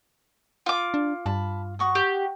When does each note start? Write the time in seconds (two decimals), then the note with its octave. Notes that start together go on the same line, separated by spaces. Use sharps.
0.66 F4 D6
0.94 D4
1.26 G2 A5 B5
1.79 F#4 C#6 D#6
1.95 G4